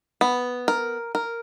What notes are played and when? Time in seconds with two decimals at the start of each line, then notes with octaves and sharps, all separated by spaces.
0.21 B3
0.68 A#4
1.15 A#4